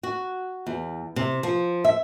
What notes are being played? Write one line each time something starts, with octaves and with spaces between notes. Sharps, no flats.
F#4
E2
C3
F3
E5